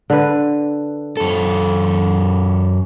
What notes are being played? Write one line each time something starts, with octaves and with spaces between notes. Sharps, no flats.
D3 B4
F#2 A4